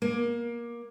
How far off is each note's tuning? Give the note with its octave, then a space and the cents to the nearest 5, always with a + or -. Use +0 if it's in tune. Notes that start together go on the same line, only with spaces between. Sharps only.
A#3 +20